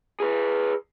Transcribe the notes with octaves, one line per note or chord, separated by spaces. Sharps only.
G#4 B4